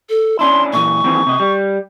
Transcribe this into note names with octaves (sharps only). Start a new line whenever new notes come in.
A4
C#4 D4 E4 C6
A#2 E3 C#6
D#2 E3 C4
C3 D#5
G3